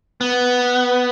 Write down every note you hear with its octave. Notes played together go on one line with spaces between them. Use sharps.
B3